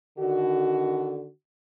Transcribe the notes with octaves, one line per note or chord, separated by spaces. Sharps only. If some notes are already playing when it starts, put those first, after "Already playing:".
D3 D#3 F#4